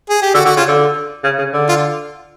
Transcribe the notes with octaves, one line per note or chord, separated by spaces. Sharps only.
G#4
G4
D3 F#4
D3 F#4
C#3 F4
D3
C#3
C#3
D3
F4